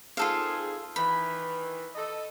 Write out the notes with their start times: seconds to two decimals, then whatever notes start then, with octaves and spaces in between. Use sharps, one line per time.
0.17 D#3 C4 F4 G#4 A4 F5
0.96 D#3 E3 B5
1.95 A4 D#5